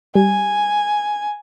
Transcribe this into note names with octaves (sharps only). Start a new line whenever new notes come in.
G3 G#5